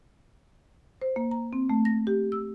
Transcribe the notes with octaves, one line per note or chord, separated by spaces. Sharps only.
C5
A#3
A#5
C4
A3
A#6
G4
E6